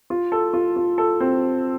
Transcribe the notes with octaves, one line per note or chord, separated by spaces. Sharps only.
F4
A4
F4
F4
A4
C4